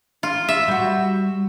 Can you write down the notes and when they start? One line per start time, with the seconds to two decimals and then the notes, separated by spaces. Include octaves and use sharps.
0.23 F4
0.48 E5
0.68 G3 F#4